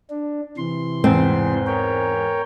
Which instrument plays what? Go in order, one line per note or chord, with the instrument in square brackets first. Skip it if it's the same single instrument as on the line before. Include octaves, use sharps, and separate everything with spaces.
[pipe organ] D4
C3 E3 C6
[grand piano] E2 G#2 [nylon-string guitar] C4
[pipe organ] A#4 C#5 G5